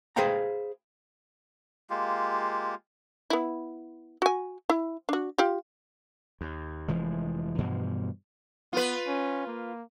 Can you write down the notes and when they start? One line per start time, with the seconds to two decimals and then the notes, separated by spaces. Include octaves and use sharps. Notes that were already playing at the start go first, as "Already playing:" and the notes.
0.16 G#4 B4 C5 F5 G5 A#5
1.90 G#3 A#3 F4 G4
3.30 B3 E4
4.22 F#4 G#5
4.70 E4
5.09 D4 F#4
5.38 F4 G4
6.41 D#2
6.88 F1 E3 F3 G#3
7.58 G2 B2 E3 F3
8.73 B3 F4 B4
9.07 C#4
9.47 A#3